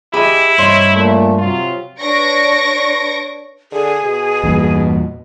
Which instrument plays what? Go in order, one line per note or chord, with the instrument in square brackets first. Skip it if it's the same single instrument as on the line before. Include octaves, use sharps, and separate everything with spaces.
[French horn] E4 [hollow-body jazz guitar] G4 G#4 D#5 [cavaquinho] B5
[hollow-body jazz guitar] G2 C#5 D#5 [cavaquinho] C5
[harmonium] A#2 A3
[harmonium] C3 F#3 [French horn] F4
[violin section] D4 B4 C#5 C#6 A#6 D7
[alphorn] D3 [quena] G#4
[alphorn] B2
[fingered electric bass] E2 G2 A#2